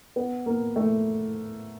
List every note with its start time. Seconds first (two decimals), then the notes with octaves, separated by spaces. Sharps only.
0.16 B3
0.46 A#3
0.76 A3